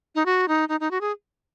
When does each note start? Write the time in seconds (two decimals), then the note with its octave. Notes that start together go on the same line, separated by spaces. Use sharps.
0.15 D#4
0.26 F#4
0.48 D#4
0.69 D#4
0.80 D#4
0.91 F#4
1.01 G#4